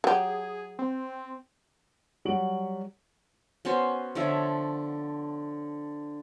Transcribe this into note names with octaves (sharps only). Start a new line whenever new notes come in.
F#3 G4 G#4
C4
F#3 G3 F#4 F#5 D7 F#7
B3 C#4 F#4 C5
D3 F3 C#5 E5